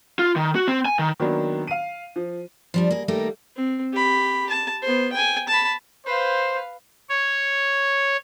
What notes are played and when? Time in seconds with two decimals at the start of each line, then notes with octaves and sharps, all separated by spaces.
0.19 F4
0.36 D#3
0.55 F#4
0.68 C4
0.86 G#5
0.99 D#3
1.20 D#3 F#3 A#3 B3 D4
1.67 F5 D#7
2.16 F3
2.74 F3 G3 D4
2.91 A#3 G#4
3.08 D#3 G3 A3 A#3 D#4 G4
3.56 C4
3.93 G4 B5
4.50 A5
4.82 B3 C5
5.13 G5 G#5
5.48 A5 B5
6.06 B4 C5 F5
7.09 C#5